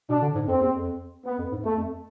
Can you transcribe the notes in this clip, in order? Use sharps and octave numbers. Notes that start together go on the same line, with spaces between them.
B2 D4
D3
G#2
F2 C4
E2
F2
B3
F2
G#2
E2 A3
F2